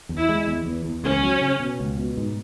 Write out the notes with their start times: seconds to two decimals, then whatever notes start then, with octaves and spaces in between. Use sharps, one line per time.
0.09 E2
0.20 E4
0.29 G#3
0.47 E2
0.66 E2
0.85 E2
1.03 C#2 C#4
1.23 F#3
1.42 C#3
1.60 B2
1.80 C#2
1.98 B2
2.17 G#2